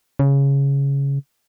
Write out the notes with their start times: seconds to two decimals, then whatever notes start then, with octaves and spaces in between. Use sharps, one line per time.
0.19 C#3